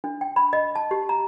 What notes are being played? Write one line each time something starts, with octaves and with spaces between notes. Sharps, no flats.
D4
G5
B5
D#5
A5
G4
A#5